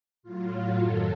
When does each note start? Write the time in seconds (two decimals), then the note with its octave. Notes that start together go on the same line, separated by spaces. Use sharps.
0.23 A2 F#3 F4
0.77 F#2 D#3 F#3 A4